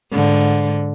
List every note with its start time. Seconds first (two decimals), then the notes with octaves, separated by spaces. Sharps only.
0.12 G#2 D3